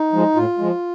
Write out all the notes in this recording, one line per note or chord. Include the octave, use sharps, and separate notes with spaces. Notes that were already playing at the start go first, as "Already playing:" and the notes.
Already playing: D#4
F3 G#3
A2 F4
F3 G#3